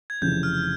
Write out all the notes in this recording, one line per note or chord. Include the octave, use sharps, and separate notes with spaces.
G#6
F1 F2 C#3 E3 G6
F6